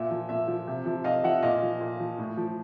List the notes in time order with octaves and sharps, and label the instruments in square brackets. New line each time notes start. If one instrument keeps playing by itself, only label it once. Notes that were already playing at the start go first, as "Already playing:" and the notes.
Already playing: [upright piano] A#2 E5
F3
A#2 E5
F3
C3
F3
C3 D#5 F5
F3 E5 F#5
A#2 D#5 F5
F3
A#2
F3
A2
F3